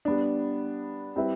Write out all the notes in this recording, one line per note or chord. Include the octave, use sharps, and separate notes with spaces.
G3 B3 D4
G3 C4 E4 B4 E5